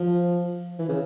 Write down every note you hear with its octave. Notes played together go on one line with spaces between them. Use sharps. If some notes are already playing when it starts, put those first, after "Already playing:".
Already playing: F3
E3
C#3